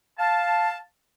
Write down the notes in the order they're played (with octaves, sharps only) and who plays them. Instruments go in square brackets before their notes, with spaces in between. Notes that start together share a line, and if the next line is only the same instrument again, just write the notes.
[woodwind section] F5 A5